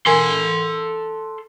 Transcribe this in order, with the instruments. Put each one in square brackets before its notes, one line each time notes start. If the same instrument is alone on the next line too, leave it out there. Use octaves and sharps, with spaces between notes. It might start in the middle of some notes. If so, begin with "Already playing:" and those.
[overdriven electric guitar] A4 C6 [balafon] A#4 G#5